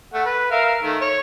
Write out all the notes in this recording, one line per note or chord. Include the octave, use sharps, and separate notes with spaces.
A3 F#5
B4
A#4 E5 F5
D#3 A3
C#5